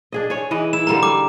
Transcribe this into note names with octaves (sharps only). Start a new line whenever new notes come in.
D4 G#4 D#5
G#4 C#5
E3 B4 D#5
E4 E7
D3 G3 A#3 A#5
G3 D6